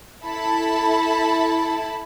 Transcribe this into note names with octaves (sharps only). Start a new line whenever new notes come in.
E4 A4 A5 B5